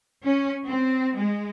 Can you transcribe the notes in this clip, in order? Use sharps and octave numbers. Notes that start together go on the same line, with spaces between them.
C#4
C4
G#3